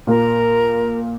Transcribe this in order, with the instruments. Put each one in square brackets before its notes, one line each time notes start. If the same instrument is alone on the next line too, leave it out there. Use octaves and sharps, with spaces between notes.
[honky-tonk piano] A#2 A#3 [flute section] A#4